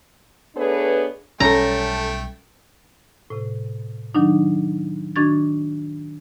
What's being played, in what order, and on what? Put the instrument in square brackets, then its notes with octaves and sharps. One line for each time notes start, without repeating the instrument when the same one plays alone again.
[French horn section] A3 B3 D4 G#4 B4 C#5
[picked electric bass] B1 G3 [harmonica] A3 G5 [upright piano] C#4 A4 [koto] A#5
[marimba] A2 C3
D#3 F#3 D4 D#4
D#3 D4 F#4 C#6 G#6 A6